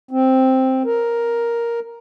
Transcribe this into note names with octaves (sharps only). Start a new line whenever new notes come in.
C4
A#4